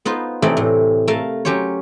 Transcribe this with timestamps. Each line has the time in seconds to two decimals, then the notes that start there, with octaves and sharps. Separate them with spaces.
0.05 B3 D#4 F4 C5
0.42 C3 E3 A3 C4 D#4 D5
0.57 A2
1.08 A3 A#4 F5 A5
1.45 F#3 C#4 G4 C5 C#5